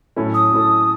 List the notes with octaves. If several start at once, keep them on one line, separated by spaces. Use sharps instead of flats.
A2 F#3 C#4 E4 A4
D#6
A2 F#3 C#4 E4 A4